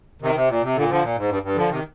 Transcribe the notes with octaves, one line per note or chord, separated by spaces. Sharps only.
C3 D#3
C3
A#2
C3
A#2 D3
D3 F3
A#2
G#2
G2
G2
D3 F3
C3 D#3